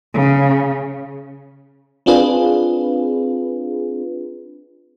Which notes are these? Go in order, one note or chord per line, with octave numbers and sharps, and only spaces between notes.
C#3
C4 D4 F4 G#4 B4